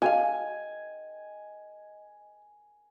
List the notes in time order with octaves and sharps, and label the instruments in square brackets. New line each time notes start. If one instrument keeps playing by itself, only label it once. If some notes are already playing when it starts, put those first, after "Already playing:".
[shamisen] F#4 A4 F5 [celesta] D#5 [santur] G#5